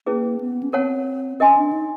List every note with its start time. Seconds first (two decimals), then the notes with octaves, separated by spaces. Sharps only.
0.06 A#3 C#4 E4 G#4 B4
0.40 B3
0.63 C#4
0.73 C4 A#4 C#5 F#5 A5
1.40 C#4 A#4 D#5 G#5 C6
1.56 D4
1.72 D#4